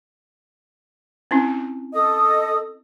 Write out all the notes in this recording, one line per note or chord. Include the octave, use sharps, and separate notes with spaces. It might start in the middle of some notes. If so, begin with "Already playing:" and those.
C4 C#4 E4
A4 D#5 D#6